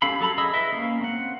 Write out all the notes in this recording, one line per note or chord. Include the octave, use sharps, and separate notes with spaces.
C#4 G4 A4 F5 B5
F#3 A4 A#5 B5
G#4 D#5 B5 E6
E4 B4 D#5 E5
A#3 C#4 F5
C4 F#5